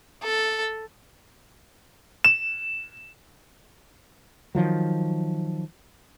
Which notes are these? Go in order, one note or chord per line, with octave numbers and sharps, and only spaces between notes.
A4
E7
D#3 F3 F#3